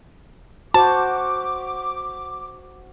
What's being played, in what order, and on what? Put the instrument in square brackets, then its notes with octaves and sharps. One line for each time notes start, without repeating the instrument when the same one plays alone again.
[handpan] F#4 C5 [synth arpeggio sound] A5 [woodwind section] D6